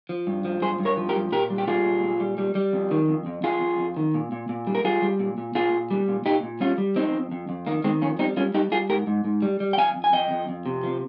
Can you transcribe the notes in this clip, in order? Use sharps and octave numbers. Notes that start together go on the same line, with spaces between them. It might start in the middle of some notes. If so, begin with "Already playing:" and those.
F3
G2
F3
G2 G#4 C5
G2
A#4 C#5
F3
G4 A#4
G2
A#2 G4 A#4
G3
G4
G3 F4 G#4
A#2
A#2
G3
G3
G3
F2
D#3
F2
F2
F2 F4 G#4
F2
F2
D#3
A#2
A#2
A#2
G3
A#4
G3 F4 G#4
G3
A#2
A#2
A#2 F4 G#4
A#2
G3
A#2
A#2 D#4 G4
A#2
G3 C#4 F4
G3
F2 C4 D#4
F2
F2
F2
D#3 A#3
D#3 G#3 C4
F2 A#3 C#4
G3 C4 D#4
G3 C#4 F4
G3 D#4 G4
G3 F4 G#4
G#2 G4 A#4
G#2
G#2
G3
G3
G5
F2 F5 G#5
F2
G#5
F2 D#5 G5
F2
F2
C3
F3